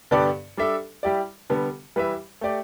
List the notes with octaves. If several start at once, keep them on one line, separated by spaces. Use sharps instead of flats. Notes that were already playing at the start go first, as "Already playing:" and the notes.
G2 D3 B3 G4 D5
G3 D4 A4 E5
G3 E4 G4 D5
D3 G3 B3
E3 G3 E4 B4 E5
A3 G4 D5